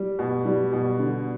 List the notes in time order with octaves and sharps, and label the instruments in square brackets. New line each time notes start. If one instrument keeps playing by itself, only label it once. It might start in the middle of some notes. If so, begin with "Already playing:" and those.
Already playing: [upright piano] G3
B2
G3
B2
D3